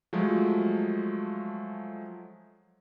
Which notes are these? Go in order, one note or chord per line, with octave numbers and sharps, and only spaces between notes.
F3 F#3 G#3 A3